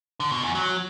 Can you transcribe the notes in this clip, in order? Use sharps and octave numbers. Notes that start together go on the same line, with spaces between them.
D3
B2
E2
F#3